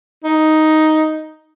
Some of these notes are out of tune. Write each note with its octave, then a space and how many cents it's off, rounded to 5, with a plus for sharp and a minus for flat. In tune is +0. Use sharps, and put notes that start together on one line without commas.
D#4 +5